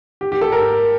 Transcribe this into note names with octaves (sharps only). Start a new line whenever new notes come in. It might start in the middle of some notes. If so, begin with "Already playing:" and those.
G4
G4
A4
A#4